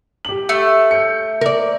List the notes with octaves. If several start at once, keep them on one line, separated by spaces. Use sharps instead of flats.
G4 F#7
A3
G6 C#7
A#4 D5